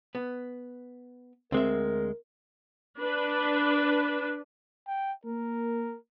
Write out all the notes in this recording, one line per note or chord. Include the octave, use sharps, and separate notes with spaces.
B3
D2 G#3 C4 A#4 E5
D4 B4
G5
A#3 A#4